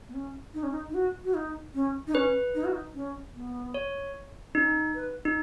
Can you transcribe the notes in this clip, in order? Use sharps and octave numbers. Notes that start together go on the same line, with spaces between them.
B3
C#4
D#4
C#4
D#4
D#4
F#4
F#4
D#4
C#4
D#4
C#4 B4
D#4
F#4
D#4
C#4
B3
C#5
C#4 D#4
B4
D#4